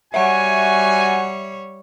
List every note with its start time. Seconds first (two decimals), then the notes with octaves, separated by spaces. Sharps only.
0.14 G3 F#4 C#5 E5 F#5 G#5